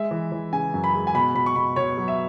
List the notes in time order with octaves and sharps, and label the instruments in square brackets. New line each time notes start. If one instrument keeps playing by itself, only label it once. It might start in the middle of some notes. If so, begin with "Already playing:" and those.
Already playing: [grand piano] G#3 E5
E3
E3
C#3 G#5
F#2
B5
G#3
G#5
B2 B5
B2 B5
C#6
B2 B5
B2 C#5
F#3
E5